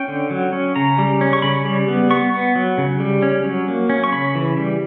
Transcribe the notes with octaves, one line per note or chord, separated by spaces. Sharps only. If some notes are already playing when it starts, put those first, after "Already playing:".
Already playing: C#4 G5
D3
F#3
C#4
C#3 A#5
G3
C#4
C#6
C#3 B5
G3
B3
B3 C#6
B3
F#3
C#3
G3
C#4
F#3
A#3
C#4
C#6
C#3 B5
E3
G3